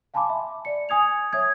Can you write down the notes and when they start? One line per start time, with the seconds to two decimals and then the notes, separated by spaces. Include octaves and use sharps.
0.14 F5 G#5 A5 B5 C6 D6
0.29 E5
0.65 D5 C#7
0.89 G#5 D#6 G#6 F7
1.33 C#5 E5 D#6 G#6